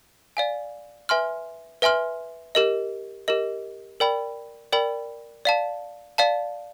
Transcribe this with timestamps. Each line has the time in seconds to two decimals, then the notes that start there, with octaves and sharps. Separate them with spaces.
0.37 D5 F5 G#5
1.09 B4 E5 G#5 C6 F6
1.82 B4 E5 G#5 C6 F6
2.55 G4 A#4 D#5
3.28 G4 A#4 D#5
4.00 A#4 D5 G5 B5
4.72 A#4 D5 G5 B5
5.45 D5 F5 A5
6.18 D5 F5 A5